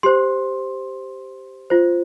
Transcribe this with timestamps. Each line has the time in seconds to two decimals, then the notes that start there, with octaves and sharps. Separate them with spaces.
0.03 G4 C5 C6
1.70 F4 C5